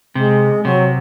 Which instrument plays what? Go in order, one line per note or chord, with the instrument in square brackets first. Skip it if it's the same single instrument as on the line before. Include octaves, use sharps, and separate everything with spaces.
[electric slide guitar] C3 [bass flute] G#3
[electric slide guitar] C3 [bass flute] F#3